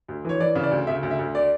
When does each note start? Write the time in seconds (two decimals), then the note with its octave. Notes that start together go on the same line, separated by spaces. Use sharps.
0.08 D2
0.25 E3 C#5
0.40 E3 D5
0.55 C#3
0.63 D5
0.71 D2
0.87 C#3 E5
1.03 D2
1.11 E5
1.19 D2
1.35 D5